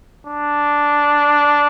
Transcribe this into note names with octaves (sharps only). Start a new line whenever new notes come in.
D4